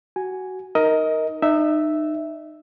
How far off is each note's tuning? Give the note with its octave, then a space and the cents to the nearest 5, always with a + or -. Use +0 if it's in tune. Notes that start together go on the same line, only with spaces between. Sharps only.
F#4 +15 G#5 +0
D#4 +0 A#4 +0 D#5 +20
D#4 -30 E5 +0